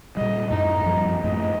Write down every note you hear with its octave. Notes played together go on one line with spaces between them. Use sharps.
A#2 G3 D#5
F#2 A2 D#4
F#2 F3 G3
F#2 A2 A3 D#5